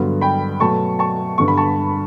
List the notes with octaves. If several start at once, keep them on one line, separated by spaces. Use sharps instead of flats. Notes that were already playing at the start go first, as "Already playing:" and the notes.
Already playing: G2 D3 F#3 B3
G5 B5
B2 F#3 A3 A5 C#6
A5 C#6
G2 D3 G3 B3 C#6
B5
A5 C#6